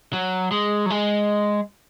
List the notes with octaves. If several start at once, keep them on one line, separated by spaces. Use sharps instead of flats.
F#3
G#3
F#3
G#3